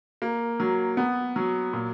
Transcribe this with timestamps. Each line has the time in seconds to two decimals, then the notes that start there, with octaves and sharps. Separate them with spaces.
0.22 A#3
0.60 F#3
0.97 B3
1.36 F#3
1.73 A#2